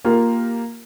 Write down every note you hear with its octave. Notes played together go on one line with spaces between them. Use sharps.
A#3 F4 G4 A#4